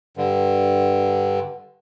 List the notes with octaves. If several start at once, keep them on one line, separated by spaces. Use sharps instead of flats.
G2 D3